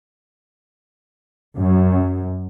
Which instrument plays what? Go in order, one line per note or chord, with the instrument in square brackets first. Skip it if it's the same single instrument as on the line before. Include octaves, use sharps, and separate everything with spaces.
[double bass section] F#2